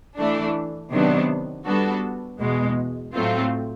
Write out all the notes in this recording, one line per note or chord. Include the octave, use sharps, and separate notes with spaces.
E3 A3 D4
C3 D#3 F#3 B3 D4
G3 B3 D4 F#4 A4
E2 B2 G#3
A2 F#3 A3 C4 F4